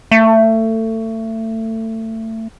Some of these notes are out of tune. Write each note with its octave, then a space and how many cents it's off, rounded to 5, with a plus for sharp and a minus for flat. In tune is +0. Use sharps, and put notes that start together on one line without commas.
A3 +25